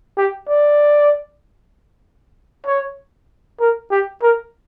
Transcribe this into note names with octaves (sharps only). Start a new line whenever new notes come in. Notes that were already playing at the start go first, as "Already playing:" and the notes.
G4
D5
C#5
A#4
G4
A#4